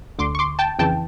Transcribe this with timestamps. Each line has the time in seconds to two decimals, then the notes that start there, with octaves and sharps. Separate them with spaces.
0.19 D2 D3 C6 D6
0.35 C#6
0.39 C6 D6
0.59 G5 A5
0.79 F2 C#3 E3 G5 A5